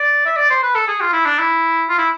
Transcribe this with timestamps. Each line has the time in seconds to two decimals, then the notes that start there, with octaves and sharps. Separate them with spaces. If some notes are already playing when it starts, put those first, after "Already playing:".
Already playing: D5
0.26 E5
0.36 D5
0.50 C5
0.63 B4
0.75 A4
0.88 G#4
1.00 F4
1.13 E4
1.25 D4
1.38 E4
1.89 F4
1.98 E4